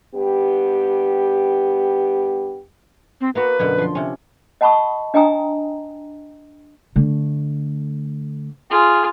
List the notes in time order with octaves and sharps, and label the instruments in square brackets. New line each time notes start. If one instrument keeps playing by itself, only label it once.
[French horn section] G2 B3 G4
[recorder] C4
[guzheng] A#3 B3 F#4 [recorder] B4
[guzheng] F#2 B2 D3
F3 C6
C3 C#4
[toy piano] D#5 F#5 A5 B5 C#6 D#6
D4 D#5 G5 G#5 A#5 D#6
[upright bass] D3 A3
[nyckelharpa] F4 [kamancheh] G#4